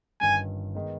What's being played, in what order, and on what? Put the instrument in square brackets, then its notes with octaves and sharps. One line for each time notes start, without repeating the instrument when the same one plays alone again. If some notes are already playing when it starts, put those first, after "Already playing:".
[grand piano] G1 G2 D#3 G3 C#4 [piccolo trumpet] G#5
[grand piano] D#3 G#3 B3 D#4